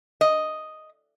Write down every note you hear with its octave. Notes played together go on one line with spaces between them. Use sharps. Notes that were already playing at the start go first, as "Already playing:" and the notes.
D#5